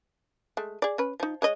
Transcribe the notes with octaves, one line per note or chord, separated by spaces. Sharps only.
G#3 A3
G#4 D5
C#4 B4
F3 D#4
G#3 C#5 D#5